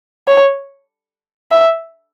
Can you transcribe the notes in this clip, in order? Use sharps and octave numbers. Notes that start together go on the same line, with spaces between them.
C#5
E5